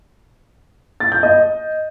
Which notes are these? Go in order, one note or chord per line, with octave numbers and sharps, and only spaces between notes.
A6
G6
D#5